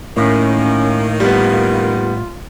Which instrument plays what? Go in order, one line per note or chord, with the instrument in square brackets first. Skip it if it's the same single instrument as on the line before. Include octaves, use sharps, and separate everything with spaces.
[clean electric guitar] A2 [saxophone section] D#3 A#3 [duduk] C#4
[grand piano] G3 B3 [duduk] F4